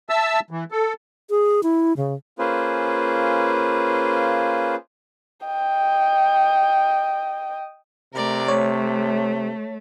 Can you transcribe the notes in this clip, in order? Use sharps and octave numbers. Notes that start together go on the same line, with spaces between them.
E5 A5 E6
E3
A4
G#4
E4
C#3
A#3 C#4 F4 G#4 B4 C5
D#5 G5
C3 A3 A#4 D5
A3 C#5